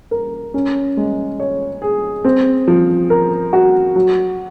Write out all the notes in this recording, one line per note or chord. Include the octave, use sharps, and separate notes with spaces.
A#4
C#4
G#3
C#5
G#4
C4
F3
A#4
F#4
F#3